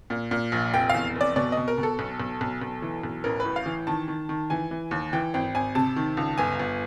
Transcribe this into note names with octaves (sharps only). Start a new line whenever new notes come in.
A#2
A#2
A#1
F1 G5
E2 F5
F1 D5
B2 D5
B2 D#5
A#4
B2
A4
B1
B1
B1
B1
E3
B1
A1 A#4
B4
A2
F5
E3
D#3 A5
D#3
D#3
E3 G#5
E3
D#2
E3 G5
G#1 G5
G#1 G#5
C3 A5
D#3
C#2
G1 G#5
G1